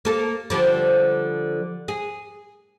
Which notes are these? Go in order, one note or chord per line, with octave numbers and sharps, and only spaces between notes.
A#3 A4
D3 F3 G3
G#4